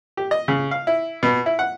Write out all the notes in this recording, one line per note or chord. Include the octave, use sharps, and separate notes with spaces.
G4
D#5
C#3
F5
E4
B2
E4
F#5